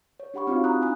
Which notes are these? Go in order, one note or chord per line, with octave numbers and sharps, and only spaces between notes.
C#5
D4 G4 F#5 B5 C#6
C4 D#4 F4 F#4 F5
A#5 B5 D#6 F#6
D4 G#5 D#6 F#6